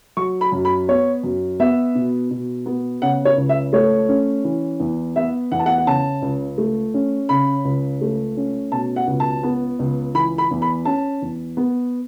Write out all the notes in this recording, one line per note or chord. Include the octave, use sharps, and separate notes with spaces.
F#3 C#6
B5
F#2
B5
B3 C#5
F#2
B3 E5
B2
B2
B3
C#3 F#5
C#5
C#2
E5
A3 C#5
C#4
E3
E2
B3 E5
E2 F#5
A5
F#5
F#5
C#3 A5
C#2
A3
C#4
C#3 B5
C#2
A3
C#4
B2 A5
F#5
C#2
A5
B3
C#2
E3 B5
B5
E2
B5
C#4 A5
E2
B3